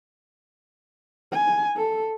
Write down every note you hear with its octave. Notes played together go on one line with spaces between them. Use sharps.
G#5
A4